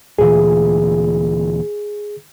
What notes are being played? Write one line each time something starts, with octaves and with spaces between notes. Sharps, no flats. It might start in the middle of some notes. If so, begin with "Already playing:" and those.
D2 A#2 E3 G#4